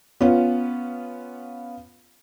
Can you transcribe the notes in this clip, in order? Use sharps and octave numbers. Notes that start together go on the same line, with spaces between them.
B3 C#4 F4